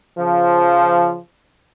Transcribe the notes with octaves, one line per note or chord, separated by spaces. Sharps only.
C#3 F3